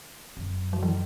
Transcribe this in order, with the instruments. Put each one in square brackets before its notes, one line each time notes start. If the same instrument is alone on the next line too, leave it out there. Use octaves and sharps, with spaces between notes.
[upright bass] F#2
[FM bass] F#3
E3